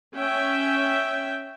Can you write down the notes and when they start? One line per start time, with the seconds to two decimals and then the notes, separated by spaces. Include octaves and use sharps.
0.15 C#4 E5 G5